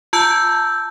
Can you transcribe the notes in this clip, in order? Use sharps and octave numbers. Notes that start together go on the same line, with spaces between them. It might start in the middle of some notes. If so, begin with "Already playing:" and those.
F4 A5 E6 G6